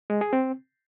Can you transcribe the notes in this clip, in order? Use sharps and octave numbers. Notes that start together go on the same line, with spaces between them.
G#3
G#4
C4